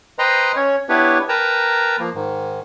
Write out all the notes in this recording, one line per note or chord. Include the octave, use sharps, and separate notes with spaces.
B4 C5 D#5 G5 A#5 C6
C#4 C#5
B3 D4 E4 G4 B4 C#5
A#4 B4 G5 A5 A#5
F3 A#3
G#2 D#3